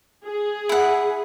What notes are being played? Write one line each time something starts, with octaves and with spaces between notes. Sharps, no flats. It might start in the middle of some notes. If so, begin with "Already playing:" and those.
G#4
E4 F#5